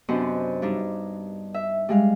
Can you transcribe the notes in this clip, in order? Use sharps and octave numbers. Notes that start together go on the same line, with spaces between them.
F#2 C3 B3 D4 C5 D#5
G2 D4 D#4
E5
G3 G#3 F5